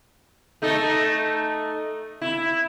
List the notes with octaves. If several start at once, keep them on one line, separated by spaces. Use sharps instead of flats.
A3 D#4 A4
E4